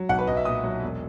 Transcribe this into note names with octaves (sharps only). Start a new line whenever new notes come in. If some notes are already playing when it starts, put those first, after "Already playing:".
Already playing: F#3
B1 F#5
B4
B1 D#5
E5
A#2 D#6
F#3
E1